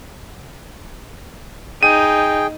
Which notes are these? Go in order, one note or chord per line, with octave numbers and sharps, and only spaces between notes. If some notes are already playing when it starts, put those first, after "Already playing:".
D#4 G#4 G5 D#7